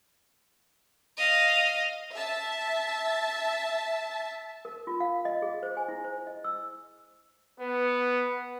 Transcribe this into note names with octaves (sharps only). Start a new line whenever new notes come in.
D#5 F5
E5 A5
A#4
F4
F5
D#5
G#4
C5
G#5
E4
C5
D#5
E6
B3 B4